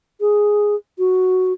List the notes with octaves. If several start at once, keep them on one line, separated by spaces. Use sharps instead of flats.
G#4
F#4